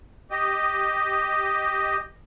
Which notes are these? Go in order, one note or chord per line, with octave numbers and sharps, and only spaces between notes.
G4 D#5